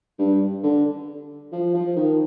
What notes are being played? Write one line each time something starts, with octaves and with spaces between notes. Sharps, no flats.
G2
D3
F3
F3
D#3